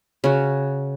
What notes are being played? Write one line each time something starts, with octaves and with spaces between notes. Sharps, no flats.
C#3 F#4